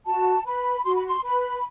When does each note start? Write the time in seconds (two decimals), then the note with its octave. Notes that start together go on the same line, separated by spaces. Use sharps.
0.06 F#4 A5
0.45 B4 B5
0.84 F#4 C6
0.95 B5
1.07 C6
1.23 B4 B5